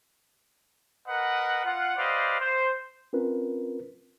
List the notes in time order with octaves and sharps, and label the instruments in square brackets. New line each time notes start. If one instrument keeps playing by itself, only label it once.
[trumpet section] A#4 B4 D#5 F#5
F4 F#5
G4 B4 C5 D5 D#5 F5
C5
[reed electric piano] C4 C#4 F4 A#4 B4